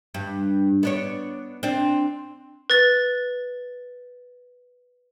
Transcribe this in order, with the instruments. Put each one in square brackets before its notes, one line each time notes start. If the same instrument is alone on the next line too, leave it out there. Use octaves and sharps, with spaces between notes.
[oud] G2
B3 D4 C#5
C4 D4
[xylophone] B4 A6